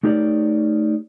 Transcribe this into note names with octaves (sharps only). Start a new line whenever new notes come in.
A3 D#4 G4 A#4 C#5 D5